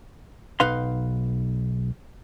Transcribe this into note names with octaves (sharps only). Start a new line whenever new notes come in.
B1 D#4 B4 F5 C6